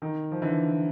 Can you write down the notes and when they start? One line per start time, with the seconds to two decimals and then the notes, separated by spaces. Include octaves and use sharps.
0.02 D#3
0.32 F3
0.42 D3 E3